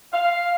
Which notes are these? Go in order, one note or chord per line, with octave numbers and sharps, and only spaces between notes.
F5